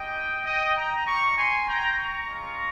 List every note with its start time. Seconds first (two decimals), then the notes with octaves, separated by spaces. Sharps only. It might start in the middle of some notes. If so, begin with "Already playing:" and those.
Already playing: G#3 D#4 G4 D#5 G5
0.45 D#5 G5
0.76 G5 A#5
1.06 G3 A#3 D#4 A#5 C#6
1.37 G#5 C6
1.67 G5 A#5
1.98 A#5 C#6
2.28 G#3 C#4 F4